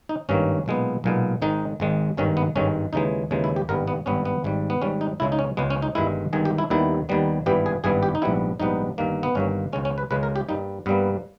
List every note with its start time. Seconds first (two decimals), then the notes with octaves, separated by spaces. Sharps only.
0.09 D#4
0.29 G#1 G2 D#3 A#3 C#4
0.66 B1 A#2 G#3 B3
1.04 B1 A#2 G#3 B3
1.42 G#1 G#2 D#3 G#3 D#4
1.80 G#1 G#2 D#3 G#3
2.17 G#1 G2 D#3 G#3 C#4
2.37 B3
2.55 G#1 G2 D#3 G#3 C#4
2.93 D#2 C#3 E3 G#3 D#4
3.31 D#2 C#3 E3 G#3
3.44 E4
3.56 G4
3.69 G#1 G2 G3 B3 A#4
3.88 B3
4.06 G#1 G2 G3 B3 C#4
4.25 B3
4.44 G#1 G#2 G3
4.70 B3
4.82 G#1 G#2 G3 C#4
5.01 D#4
5.20 C#2 C#3 G#3 E4
5.32 D#4
5.39 C#4
5.57 C#2 C#3 G#3 B3
5.70 C#4
5.82 D#4
5.95 G1 G2 D#3 G#3 E4
6.33 G1 G2 D#3 G#3 G#4
6.45 G4
6.58 E4
6.70 D#2 D#3 G3 B3 E4
7.09 D#2 D#3 G3 B3
7.46 G#1 G2 E3 G3 B3 G4
7.66 G#4
7.84 G#1 G2 E3 G3 B3 G#4
8.03 G4
8.15 D#4
8.22 A#1 G#2 G3 B3 E4
8.60 A#1 G#2 G3 B3 D#4
8.98 G1 G2 D#3 A#3
9.23 B3
9.35 G1 G2 D#3 A#3 C#4
9.73 C#2 C#3 G#3 C#4
9.85 C#4
9.98 B4
10.11 C#2 C#3 G#3 B4
10.23 A#4
10.36 G4
10.49 G2 G3 A#3 D#4
10.86 G2 G3 A#3 B3